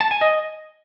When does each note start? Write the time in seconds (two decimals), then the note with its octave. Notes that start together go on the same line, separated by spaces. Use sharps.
0.01 A5
0.11 G#5
0.21 D#5